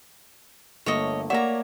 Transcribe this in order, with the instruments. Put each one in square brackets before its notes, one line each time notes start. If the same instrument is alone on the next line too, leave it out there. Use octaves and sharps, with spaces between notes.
[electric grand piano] G1 [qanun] A3 A#3 [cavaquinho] C#5 D#5
[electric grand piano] A#3 D5 [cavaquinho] C#5 A#5 [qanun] E5 [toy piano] F#5